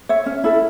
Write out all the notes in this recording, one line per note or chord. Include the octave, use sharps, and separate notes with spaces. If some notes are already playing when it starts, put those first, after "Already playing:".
C#5 E5
C#4
E4 A4